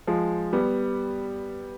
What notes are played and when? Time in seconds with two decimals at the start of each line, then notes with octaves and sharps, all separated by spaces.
0.07 F3 G#3
0.53 G3 B3